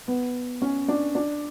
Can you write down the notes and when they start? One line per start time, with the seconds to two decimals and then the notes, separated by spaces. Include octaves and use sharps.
0.08 B3
0.62 C#4
0.88 D4
1.15 D4